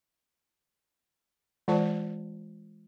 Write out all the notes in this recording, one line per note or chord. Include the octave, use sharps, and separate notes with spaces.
E3 G#3 F4 C5 D5 A5